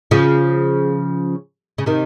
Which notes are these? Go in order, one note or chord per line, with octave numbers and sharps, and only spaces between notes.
C#3 F3
C#3
C3 D#3